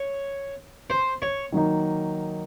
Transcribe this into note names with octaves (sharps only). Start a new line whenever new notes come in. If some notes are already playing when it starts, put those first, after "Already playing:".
Already playing: C#5
C5
C#5
D#3 F#3 A#3 D#4